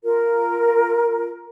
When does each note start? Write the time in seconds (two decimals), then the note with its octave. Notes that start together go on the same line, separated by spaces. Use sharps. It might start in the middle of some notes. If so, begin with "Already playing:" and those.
0.04 F4 A#4